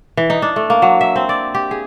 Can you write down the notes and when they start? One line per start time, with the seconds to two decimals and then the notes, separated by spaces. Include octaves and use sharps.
0.17 E3
0.30 D#4
0.42 D4
0.56 A3
0.70 A#3
0.82 F#3
1.01 E5
1.16 C4
1.29 D5
1.55 G4
1.71 G#4